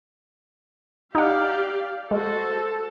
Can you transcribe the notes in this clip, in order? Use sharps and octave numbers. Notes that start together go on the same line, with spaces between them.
D#4 G4 D5 F5 F#5
G#3 F#4 A4 C5